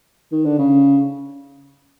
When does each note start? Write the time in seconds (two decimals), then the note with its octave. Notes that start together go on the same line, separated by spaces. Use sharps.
0.32 D#3
0.45 D3
0.59 C#3